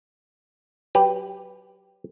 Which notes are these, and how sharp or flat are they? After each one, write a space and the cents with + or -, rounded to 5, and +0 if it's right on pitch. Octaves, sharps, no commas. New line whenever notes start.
F#3 +20 G4 +0 B4 +0